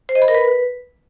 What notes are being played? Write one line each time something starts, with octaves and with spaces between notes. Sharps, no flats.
C5
D#5
B5
A#4
B4